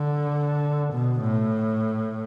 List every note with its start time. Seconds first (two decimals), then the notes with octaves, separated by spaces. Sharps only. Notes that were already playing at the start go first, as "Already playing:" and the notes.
Already playing: D3
0.93 B2
1.21 A2